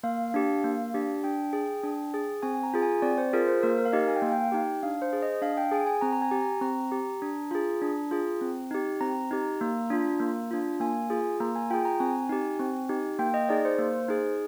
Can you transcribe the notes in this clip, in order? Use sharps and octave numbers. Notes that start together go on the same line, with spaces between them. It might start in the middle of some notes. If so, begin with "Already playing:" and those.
A#3 F5
D4 G4
A#3
D4 G4
D4 G5
G#4
D4
G#4
C4 G#5
G#5
A#5
F4 G#4
G#5
C4 D5
C5
F4 G#4 A#4
C5
A#3 A#4
A#4
F5
D#4 G4 D#5
G#5
G5
A#3 F5
G5
D#4 G4
D4 F5
C5
G#4
D#5
D4 F5
G5
G#4 G#5
G#5
C4 A#5
A#5
G#5
G4
A#5
C4 A#5
G4
D4
F4 G#4
D4
F4 G#4
C4
D#4 G4
C4 A#5
D#4 G4
A#3
D4 F4
A#3
D4 F4
A#3 G#5
F4 G#4
A#3 A#5
G#5
F4 G#4 G5
A#5
C4 G#5
D#4 G4
C4
D#4 G4
A#3 G5
D#5
D#4 G#4 D5
C5
A#3
D#4 G#4